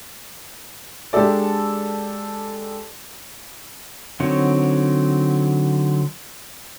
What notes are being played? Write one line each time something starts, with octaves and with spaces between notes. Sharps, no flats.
G#3 D4 G4 A4 D5
D3 F#3 C4 D#4 C#5